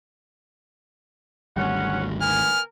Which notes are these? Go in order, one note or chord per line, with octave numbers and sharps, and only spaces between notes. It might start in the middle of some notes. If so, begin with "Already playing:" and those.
G#1 D2 G3 C#4 F#5
B3 A#4 G#5 F6